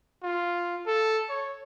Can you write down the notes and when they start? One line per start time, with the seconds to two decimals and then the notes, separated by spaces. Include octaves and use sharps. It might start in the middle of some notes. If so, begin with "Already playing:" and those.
0.23 F4
0.86 A4
1.30 C#5